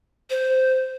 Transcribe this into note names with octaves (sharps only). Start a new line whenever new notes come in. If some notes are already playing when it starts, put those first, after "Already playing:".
C5